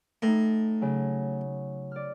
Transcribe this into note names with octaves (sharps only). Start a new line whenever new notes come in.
A2 A3 D#4
C#3 F#3
D5 F6